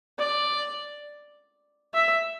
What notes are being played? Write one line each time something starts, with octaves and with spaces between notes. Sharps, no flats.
D5
E5